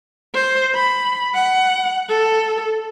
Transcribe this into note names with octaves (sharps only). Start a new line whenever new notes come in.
C5
B5
F#5
A4